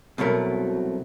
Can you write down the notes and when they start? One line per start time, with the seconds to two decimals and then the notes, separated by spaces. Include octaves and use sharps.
0.18 C2 B2 F#3 A3 A#4